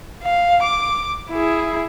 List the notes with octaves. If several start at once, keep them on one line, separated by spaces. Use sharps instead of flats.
F5
D6
E4 G#4